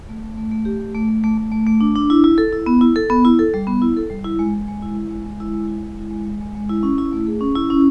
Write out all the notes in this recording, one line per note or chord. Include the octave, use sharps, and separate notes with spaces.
A3
A3
A3
A3
G4
A3
A3
A3
A3
A3
A3
A3
D4
D4
E4
E4
A4
E4
B3
E4
A4
B3
E4
A4
G3
B3
E4
A4
G3
E4
G#3
G#3
G#3
E4
E4
G#3
G#3
E4
G#3
E4
G#3
E4
G#3
G#3
G#3
G#3
E4
C#4
E4
A3
G#4
C#4
E4
C#4